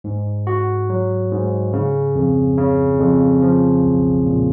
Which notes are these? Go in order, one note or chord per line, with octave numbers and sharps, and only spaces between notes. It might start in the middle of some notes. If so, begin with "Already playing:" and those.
G#2
F#4
F#3
G#2
C#3
F2
C#3
F2
F3
B1
A#2